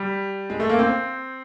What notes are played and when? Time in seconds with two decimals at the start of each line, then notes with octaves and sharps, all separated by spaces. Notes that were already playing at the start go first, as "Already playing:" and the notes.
Already playing: G3
0.50 G#3
0.60 A3
0.69 A#3
0.79 C4